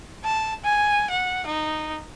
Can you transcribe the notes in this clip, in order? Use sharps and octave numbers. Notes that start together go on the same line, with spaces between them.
A5
G#5
F#5
D#4